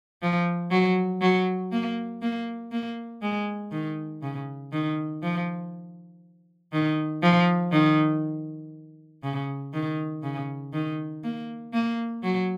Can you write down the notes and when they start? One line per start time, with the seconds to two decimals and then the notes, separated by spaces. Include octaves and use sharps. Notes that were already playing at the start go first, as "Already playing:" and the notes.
0.22 F3
0.71 F#3
1.21 F#3
1.72 A#3
2.22 A#3
2.72 A#3
3.22 G#3
3.72 D#3
4.22 C#3
4.73 D#3
5.23 F3
6.73 D#3
7.23 F3
7.72 D#3
9.23 C#3
9.74 D#3
10.23 C#3
10.73 D#3
11.24 A#3
11.74 A#3
12.23 F#3